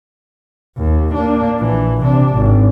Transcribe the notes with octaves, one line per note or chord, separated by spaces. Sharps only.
D#2
A#3 D4
A#1 E3
C3 D4
G#1